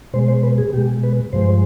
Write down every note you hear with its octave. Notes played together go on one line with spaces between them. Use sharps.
B2 G#3 C5
C5
B4
G#4
B2 G#3 G4
B4
G2 F3 G#3 C5